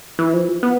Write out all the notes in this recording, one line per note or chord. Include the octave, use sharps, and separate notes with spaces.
E3
F3
B3